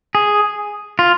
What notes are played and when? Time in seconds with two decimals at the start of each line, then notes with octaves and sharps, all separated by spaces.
0.15 G#4
0.99 F4